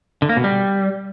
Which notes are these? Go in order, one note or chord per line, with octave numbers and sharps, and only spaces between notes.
D3
A#3
B2
G3